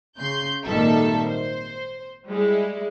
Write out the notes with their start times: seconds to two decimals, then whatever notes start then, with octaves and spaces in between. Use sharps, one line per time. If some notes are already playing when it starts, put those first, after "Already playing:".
0.18 C#3 C6 G6
0.65 G#1 A#2 D#3 G3 A4 E5
1.27 C5
2.30 G3 G#3 E4